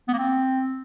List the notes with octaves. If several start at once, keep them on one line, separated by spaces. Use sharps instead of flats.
B3
A#3
C4